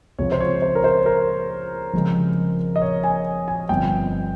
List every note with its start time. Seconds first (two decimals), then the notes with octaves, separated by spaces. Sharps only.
0.18 C#2 C3 F3 C4 C#5
0.32 C5
0.40 C#5
0.62 C5
0.75 A#4
0.84 C5
1.06 A#4
1.93 F1 F2 C#3 G#3
2.76 D#5
2.82 C#5
3.04 G#5
3.48 G#5
3.69 G1 G2 F3 C4 G5